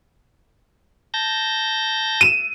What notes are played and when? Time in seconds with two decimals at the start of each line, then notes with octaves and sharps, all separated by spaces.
1.14 A5 G6 A#6
2.21 D#7 E7